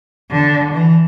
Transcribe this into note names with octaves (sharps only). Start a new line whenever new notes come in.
D3
E3